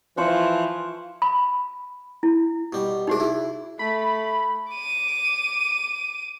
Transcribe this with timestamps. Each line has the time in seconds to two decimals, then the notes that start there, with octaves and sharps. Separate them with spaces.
0.17 E3 F3 F4 C5 A5 C#6 F#6
1.22 B5
2.23 E4
2.73 B2 G3
3.08 C2 D4 D#4 F#4 G#4
3.20 E4
3.79 A3 B5
4.73 D6 D#7